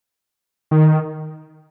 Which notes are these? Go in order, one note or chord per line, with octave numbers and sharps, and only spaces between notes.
D#3